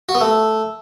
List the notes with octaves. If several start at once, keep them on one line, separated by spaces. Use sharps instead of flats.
F#4
B3
A3